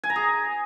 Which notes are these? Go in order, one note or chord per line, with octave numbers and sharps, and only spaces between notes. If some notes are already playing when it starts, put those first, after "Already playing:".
G#5
A#5
G#4